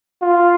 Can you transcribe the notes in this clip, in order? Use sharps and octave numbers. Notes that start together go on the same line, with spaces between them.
F4